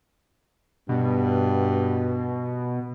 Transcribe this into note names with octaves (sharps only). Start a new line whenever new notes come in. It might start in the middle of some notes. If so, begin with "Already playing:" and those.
G2 B2